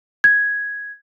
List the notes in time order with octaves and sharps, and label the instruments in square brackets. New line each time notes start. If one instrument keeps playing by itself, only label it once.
[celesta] G#6